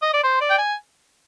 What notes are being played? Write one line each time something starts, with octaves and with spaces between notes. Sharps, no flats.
D#5
D5
C5
D5
G5
G#5